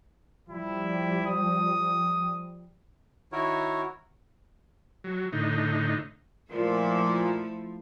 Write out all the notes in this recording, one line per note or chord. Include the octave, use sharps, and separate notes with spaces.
F3 G3 E4
D#6
D#3 E4 F#4 A#4 C#5
F#3
A2 D3 D#4
A#2 F3 A3 E4 A4